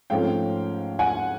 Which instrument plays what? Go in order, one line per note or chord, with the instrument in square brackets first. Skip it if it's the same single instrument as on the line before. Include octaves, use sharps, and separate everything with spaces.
[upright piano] G#2 F3 A3 C#4 F5 G5
F#5 G#5